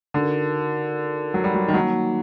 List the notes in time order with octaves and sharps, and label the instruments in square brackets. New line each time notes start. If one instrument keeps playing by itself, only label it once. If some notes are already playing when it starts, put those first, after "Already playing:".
[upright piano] D3 [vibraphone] D#4 F#4 A#4
[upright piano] F#3
G3
F#3
D#3
[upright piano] F#3 [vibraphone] G3 A#3 D#4